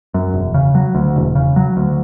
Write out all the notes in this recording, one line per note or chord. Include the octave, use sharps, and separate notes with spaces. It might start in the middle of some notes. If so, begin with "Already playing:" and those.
F#2
E1
C#3
F#3
D2
E1
C#3
F#3
D2